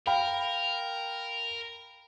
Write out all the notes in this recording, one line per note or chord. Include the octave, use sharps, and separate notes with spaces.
A#4 F5 G5 B5